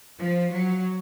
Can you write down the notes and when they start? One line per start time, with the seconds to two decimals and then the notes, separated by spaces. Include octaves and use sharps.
0.19 F3
0.50 F#3